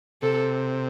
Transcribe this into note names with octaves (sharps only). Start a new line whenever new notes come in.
C3 A4